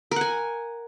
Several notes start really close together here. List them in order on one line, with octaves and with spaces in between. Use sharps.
A#4 F#5 G#5